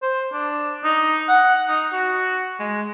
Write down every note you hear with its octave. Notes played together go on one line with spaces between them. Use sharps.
C5
D4
D#4
F#5
D#4
F#4
G#3